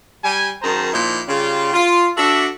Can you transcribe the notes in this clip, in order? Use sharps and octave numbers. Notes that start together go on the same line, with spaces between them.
G3 G#5
F#2 D#3 G#4 C5 A5 A#5
A#2 F3 D#4 E4
C#3 G3 F4
F4
D4 F#4 A4 D5 E5